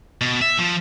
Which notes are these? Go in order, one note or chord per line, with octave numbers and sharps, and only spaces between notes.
B2
E5
F3